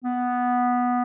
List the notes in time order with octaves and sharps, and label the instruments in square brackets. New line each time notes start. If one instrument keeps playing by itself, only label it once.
[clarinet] B3